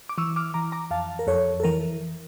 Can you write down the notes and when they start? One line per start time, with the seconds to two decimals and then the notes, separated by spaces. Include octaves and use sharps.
0.09 D6
0.18 E3 C#6 E6
0.36 D6 F6
0.54 E3 A#5 D6
0.72 A#5 D6
0.91 F2 F5 A5
1.19 A#4
1.27 F2 A4 C#5
1.60 A4
1.64 E3 A#4